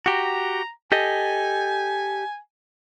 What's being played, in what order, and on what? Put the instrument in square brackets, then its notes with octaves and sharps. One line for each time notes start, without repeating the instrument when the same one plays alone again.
[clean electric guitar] F#4 G4 [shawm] A#5
[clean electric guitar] G4 A4 D#5 [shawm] G#5